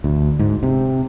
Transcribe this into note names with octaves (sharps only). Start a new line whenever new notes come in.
D2
G#2
C3